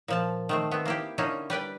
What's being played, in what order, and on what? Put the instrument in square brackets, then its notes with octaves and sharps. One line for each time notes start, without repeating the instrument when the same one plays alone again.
[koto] A#2 F3 A5
D#3 A3 C4
B3 C4
A#3 E4 G4
D3 A#3 C#4 D#4 E4
G3 B4 D5 G5